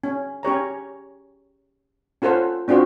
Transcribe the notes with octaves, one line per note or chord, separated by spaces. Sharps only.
C#4
C#4 G4 C#5 A#5
C#4 F4 A4 C5 F#5
C4 D4 F4 F#4 C5